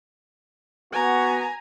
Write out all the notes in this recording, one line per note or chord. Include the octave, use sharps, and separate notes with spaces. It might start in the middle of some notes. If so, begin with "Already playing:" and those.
B3 F#4 G#5 A#5